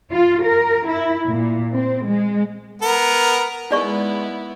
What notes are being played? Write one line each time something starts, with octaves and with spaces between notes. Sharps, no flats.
F4
A#4
E4
A#2
C4
G#3
B3 A#4
G#3 B3 D#4 E4 D5 C#6